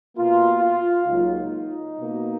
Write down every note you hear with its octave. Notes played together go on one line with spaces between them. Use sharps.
B2 A#3 F4
F4
C#2 C#3 F#3 A#3 D#4
B2 A#3